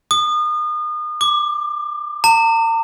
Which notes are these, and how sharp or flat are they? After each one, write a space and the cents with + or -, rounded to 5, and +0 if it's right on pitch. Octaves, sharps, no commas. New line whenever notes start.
D#6 -35
D6 +20
A#5 -40